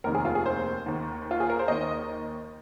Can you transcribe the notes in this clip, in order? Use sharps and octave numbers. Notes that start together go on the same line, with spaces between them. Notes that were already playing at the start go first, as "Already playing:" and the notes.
F1 D#2 D#3 A#4
G#4
F4
G#4
C5
D#2 D#3
F4
G#4
A#4
C5
D#2 D#3 D#5